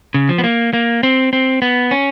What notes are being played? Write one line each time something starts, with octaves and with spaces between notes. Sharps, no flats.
C#3
F3
B3
A#3
A#3
C4
C4
B3
C#4